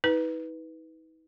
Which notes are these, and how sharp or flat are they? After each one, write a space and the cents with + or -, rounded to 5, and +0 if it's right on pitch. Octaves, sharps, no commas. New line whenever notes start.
D#4 +45 B4 +0